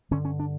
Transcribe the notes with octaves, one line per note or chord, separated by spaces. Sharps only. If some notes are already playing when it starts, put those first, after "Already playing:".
G2 D3 C#4
C#4
D4